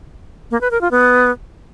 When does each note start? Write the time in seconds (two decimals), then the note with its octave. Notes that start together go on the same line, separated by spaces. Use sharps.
0.51 A#3
0.61 B4
0.71 A#4
0.81 F4
0.91 B3